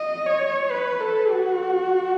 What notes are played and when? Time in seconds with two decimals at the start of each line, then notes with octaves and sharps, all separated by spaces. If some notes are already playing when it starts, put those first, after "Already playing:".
Already playing: D#5
0.26 C#5
0.71 B4
1.01 A4
1.31 F#4